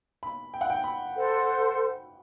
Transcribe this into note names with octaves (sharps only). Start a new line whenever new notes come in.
B5
G5
F#5
G5
B5
A4 C5 F#5 C6